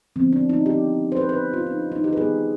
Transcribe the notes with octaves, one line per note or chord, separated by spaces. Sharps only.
D3 F3 G#3 B3 C4
D4
D#4
G4
C5
B4
B4
F4
D#4
D4
D#4
G4
B4
D#3 G3 B3 G#4